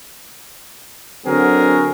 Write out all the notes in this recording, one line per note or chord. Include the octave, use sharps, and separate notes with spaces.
D3 F#3 C4 F#4 G#4 A#4